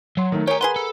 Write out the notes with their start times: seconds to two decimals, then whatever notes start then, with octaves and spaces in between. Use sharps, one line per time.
0.17 F#3 F#5 C6
0.32 D#3 A3
0.47 G4 G#4 A#4 C#5
0.61 G#4 B4 F#5 C6
0.76 A4